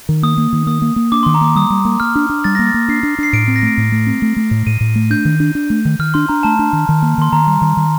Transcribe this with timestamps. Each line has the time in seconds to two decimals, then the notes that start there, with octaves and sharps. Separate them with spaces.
0.09 D#3
0.23 A#3 D#6
0.37 A#3
0.53 D#3
0.67 A#3 D#6
0.82 A#3
0.96 A#3
1.12 D4 D6
1.23 D#3 C6
1.34 A#5
1.41 A#3 D6
1.56 G3 D#6
1.70 G3
1.85 A#3
2.00 A#3 F6
2.15 D4
2.30 D4
2.44 G3 A6
2.55 A#3 A#6
2.67 A6
2.74 A#3
2.88 D4 C7
3.03 D4
3.18 D4 C7
3.33 A2 D7
3.48 C4
3.56 A#6
3.63 A3 D7
3.78 A2
3.92 A3
4.07 C4
4.22 A3
4.36 A3
4.51 A2
4.66 A2 D#7
4.81 A2
4.95 A3
5.10 D4 G6
5.25 D#3
5.40 D4
5.55 D4
5.70 A3
5.85 D#3
5.99 D#3 F6
6.14 D4 C6
6.29 D4 A#5
6.43 A3 A5
6.59 D4
6.73 D#3
6.89 D#3
7.02 A#3
7.18 D#3 C6
7.32 D#3 A#5
7.47 G3
7.61 D#3
7.77 D#3